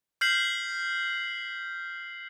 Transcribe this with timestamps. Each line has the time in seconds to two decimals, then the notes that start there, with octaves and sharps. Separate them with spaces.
0.21 F6 G6 B6 C7 F#7